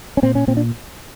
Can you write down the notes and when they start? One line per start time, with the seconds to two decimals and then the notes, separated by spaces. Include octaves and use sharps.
0.17 C#4
0.22 A#2 C4
0.35 C#4
0.47 A#2 C4
0.57 D4